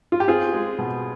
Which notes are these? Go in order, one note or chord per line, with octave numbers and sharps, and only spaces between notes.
F4
G4
C4 F4 G#4
G#3
B2